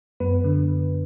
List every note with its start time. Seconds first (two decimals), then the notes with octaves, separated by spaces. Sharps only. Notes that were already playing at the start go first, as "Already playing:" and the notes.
0.20 F#2 B3 B4
0.44 D3